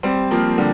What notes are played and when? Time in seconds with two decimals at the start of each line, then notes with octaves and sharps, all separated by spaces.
0.03 G3 C4
0.31 F3 A#3
0.58 D3 G3